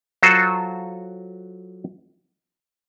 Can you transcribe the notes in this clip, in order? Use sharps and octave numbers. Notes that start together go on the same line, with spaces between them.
F#3 F4 F#4 A4 C5